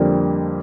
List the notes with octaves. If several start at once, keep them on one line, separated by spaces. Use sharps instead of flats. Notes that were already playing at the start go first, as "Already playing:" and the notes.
Already playing: F2 D3 G3 A#3